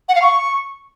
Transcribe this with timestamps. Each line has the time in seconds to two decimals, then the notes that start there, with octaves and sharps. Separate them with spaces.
0.09 F#5
0.15 F5
0.22 C#6